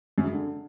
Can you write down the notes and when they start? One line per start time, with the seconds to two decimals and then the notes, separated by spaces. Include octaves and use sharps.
0.18 F#2
0.25 C#3
0.33 D3